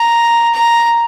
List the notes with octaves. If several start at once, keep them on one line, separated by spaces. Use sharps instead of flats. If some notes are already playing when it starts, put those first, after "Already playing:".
Already playing: A#5
A#5